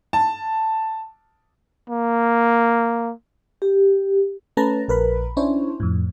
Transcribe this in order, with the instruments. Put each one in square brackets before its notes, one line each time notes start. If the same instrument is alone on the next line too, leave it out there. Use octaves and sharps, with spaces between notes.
[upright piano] A5
[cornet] A#3
[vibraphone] G4
[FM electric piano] A3 C#4 B4 A5 A#5
A#1 A#4 B4 B5
C#4 D4 E4 C5 C#5
F2 A2